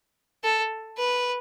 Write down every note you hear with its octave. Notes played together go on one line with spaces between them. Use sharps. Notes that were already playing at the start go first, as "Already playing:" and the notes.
A4
B4